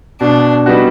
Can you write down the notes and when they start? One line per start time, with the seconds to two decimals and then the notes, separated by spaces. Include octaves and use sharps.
0.21 B2 D4
0.66 G3 B3 D#4 F#4